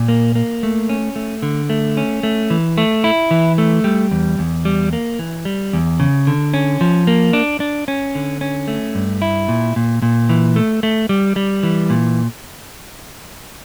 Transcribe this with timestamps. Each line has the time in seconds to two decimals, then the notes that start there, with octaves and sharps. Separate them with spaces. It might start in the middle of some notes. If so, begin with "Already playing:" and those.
Already playing: A#2
0.08 A#3
0.35 A#3
0.63 A3
0.89 C#4
1.16 A3
1.42 D3
1.70 A3
1.97 C#4
2.23 A3
2.50 E3
2.78 A3
3.04 E4
3.31 E3
3.58 A3
3.84 G3
4.11 E2
4.39 E2
4.65 G3
4.93 A#3
5.19 E3
5.45 G3
5.73 E2
6.00 C#3
6.27 D3
6.54 C#4
6.81 F3
7.07 A#3
7.33 D4
7.60 D4
7.88 C#4
8.15 D3
8.41 C#4
8.68 A3
8.95 G2
9.22 E4
9.48 A#2
9.76 A#2
10.02 A#2
10.29 E3
10.56 A3
10.83 A3
11.09 G3
11.36 G3
11.63 E3
11.90 A#2